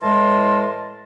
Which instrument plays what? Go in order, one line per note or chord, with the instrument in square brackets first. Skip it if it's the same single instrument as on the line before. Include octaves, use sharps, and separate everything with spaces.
[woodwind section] A2 E3 G#3 A#4 A5 C6